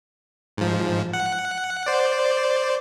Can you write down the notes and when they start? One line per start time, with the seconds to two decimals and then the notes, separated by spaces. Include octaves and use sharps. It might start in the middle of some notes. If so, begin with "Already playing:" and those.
0.57 G#2 F3
1.13 F#5
1.86 C5 D5